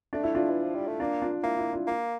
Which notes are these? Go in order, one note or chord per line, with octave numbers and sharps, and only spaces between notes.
A3 D4
E4
D4 F4
E3
F3
G3
A3
A#3 D4 F4
D4 F4
A#3 E4
E4
D4 F4
A#3